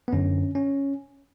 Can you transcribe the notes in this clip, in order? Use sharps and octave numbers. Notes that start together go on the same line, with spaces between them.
B3
F#2 D3 C#4
C#4